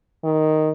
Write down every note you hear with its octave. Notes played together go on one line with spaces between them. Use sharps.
D#3